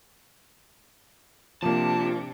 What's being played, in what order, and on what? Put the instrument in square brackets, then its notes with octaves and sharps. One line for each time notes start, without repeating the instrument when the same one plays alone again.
[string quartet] C3 D4 [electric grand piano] F3 A#3 [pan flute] F4 [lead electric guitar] A5